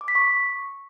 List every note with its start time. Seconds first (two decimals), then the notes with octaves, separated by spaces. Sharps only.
0.01 D6
0.08 B6
0.15 C#6